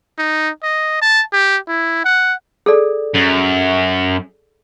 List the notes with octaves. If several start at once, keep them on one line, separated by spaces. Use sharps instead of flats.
D#4
D#5
A5
G4
E4
F#5
G#4 A4 D5
F#2